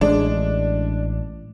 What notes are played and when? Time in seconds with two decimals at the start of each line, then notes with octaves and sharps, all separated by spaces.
0.01 A1 G#3 D4